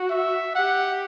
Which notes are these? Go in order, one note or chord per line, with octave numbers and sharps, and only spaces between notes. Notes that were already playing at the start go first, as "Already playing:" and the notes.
Already playing: F#4
E5
G4 F#5